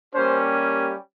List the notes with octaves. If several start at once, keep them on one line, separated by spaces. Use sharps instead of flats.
G3 A#3 C#4 G4 C5